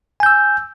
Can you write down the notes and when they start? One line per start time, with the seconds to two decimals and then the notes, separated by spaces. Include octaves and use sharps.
0.20 G#5
0.23 G6
0.26 E6